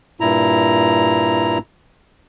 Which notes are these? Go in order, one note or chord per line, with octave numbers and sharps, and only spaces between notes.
G2 A#2 E4 A#5